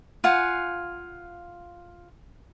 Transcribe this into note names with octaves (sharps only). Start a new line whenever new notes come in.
F4 F5 F#5 G#5